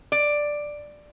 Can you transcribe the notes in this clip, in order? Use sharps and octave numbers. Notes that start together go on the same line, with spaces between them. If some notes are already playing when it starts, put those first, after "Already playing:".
D5